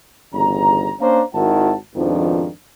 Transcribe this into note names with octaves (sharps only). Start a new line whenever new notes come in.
G1 E2 C#3 A#5
A#3 C#4 D4 C5 F5 A#5
G#1 D#3 E4 F#4 F#5 A5
F2 G#2 B2 D#3 F3 D4